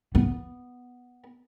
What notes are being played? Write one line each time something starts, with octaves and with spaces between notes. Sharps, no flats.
B3